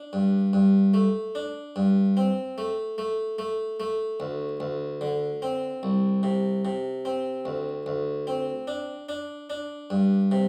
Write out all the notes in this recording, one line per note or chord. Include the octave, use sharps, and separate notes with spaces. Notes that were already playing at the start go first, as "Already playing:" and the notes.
Already playing: D4
G2
G2
A3
D4
G2
C4
A3
A3
A3
A3
D2
D2
D3
C4
C2
C3
C3
C4
D2
D2
C4
D4
D4
D4
G2
C3